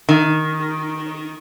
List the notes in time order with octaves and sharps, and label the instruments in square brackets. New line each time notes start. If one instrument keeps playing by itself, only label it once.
[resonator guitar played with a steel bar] D#3